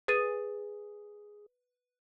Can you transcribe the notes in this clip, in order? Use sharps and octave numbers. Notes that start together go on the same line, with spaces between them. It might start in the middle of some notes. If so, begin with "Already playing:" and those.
G#4 B4 A6 D#7